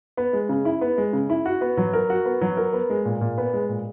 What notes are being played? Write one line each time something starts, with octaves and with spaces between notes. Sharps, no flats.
B3
G#3
C#3
E4
B3
G#3
C#3
E4
F#4
B3
F#3
A#4
F#4
B3
F#3
A#4
B3
G#3
A#2
A#2
B3
G#3
A#2